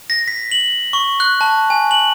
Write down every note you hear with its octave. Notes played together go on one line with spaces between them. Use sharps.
A#6
B6
F#7
C#6
F#6
A5
G#5
F#7